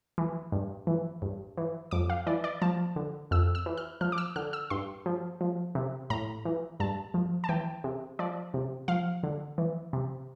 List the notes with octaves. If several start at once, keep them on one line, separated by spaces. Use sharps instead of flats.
E3
G2
E3
G2
E3
F2 D6
F5
E3 D5
D5
F3 A5
D3
F2 E6
E6
E3
F6
F3 F6
D6
E6
D3 F6
E6
G2 C6
F3
F3
C3
A2 A#5
E3
G2 A5
F3
A5
E3 G5
C3
F3 D5
C3
F3 F5
D3
E3
C3